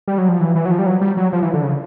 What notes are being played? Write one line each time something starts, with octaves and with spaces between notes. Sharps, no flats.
G3
F#3
F3
E3
E3
F#3
F3
G3
F#3
G3
F#3
F3
E3
D3
C#3